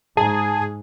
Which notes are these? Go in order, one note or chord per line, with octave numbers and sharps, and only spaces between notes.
G#2 G#4 A5 A#5